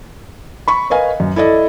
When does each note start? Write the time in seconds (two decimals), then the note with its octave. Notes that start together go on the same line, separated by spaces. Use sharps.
0.68 B5 C#6
0.90 A#4 B4 D#5 F5 G#5
1.20 F#2
1.36 E4 A4 D5 D#5